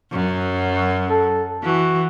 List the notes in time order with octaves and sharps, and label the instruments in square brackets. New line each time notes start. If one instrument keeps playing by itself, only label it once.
[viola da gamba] F#2 F#3
[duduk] A4
[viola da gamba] E3 [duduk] F#4